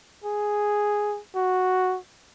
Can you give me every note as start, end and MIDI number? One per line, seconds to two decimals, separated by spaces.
0.24 1.20 68
1.35 1.97 66